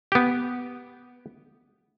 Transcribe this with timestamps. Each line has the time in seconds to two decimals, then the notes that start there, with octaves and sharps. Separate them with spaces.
0.12 B3 G4